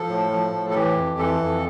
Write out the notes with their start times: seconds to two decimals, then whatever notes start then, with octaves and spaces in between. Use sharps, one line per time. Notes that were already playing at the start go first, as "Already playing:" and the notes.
Already playing: F3 A4
0.08 A2
0.31 F3
0.53 A2
0.70 A4
0.75 E3 G4
0.97 F2
1.18 E3 A4
1.41 F2